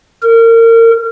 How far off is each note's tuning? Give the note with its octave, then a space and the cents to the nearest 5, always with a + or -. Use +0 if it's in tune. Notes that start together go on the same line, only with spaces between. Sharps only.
A#4 -30